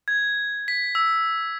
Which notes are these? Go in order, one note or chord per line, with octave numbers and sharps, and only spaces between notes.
G#6
B6
E6